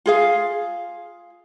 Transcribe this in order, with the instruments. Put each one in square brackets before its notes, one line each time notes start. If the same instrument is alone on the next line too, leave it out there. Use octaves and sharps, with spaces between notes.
[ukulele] F4 G#4 F5